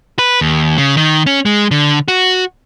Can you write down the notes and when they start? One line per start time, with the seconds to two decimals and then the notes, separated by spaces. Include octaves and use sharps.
0.19 B4
0.41 D#2
0.78 C#3
0.97 D#3
1.27 C#4
1.45 G#3
1.71 D3
2.08 F#4